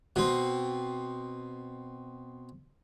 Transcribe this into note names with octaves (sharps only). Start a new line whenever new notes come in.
B2 C4